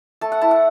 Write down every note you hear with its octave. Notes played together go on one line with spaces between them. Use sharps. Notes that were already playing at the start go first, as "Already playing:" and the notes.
A3 A5
F#5
E4 A5
F#5